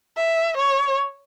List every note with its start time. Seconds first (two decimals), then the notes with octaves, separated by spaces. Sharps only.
0.17 E5
0.57 C#5